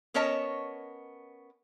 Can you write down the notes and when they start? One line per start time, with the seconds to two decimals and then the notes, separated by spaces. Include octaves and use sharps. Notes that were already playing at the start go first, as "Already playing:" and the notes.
0.14 B3 C#4 A#4 C#5 D#5 A5